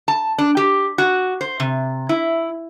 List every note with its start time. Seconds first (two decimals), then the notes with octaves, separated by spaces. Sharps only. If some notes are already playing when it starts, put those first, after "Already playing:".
0.08 A5
0.38 D4
0.57 G4
0.98 F#4
1.41 C5
1.60 C3
2.09 E4